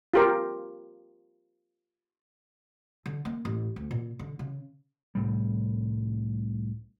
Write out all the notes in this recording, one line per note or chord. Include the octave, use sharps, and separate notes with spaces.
F4 G4 A#4
D3
A#3
A1
D2
A#2
D3
C#3
C2 A2 G3